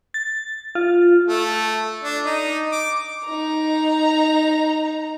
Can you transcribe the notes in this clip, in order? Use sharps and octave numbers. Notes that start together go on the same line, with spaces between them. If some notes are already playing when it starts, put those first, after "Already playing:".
A6
F4
A3
D4
D#4
D6
D#4 A#5